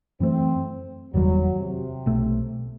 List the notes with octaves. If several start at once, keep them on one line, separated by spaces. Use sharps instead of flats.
F#2 E3 A3 C4
F#1 E2 D#3 F#3 G3
C3
B1 B2 A3